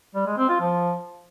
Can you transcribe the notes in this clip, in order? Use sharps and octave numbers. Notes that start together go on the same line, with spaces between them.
G3
G#3
C4
F4
F3